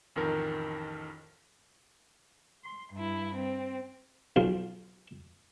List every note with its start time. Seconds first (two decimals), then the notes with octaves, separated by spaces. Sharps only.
0.16 A1 F2 D#3 A#4
2.63 C6
2.93 G2 E4
3.35 C4
4.36 B1 F4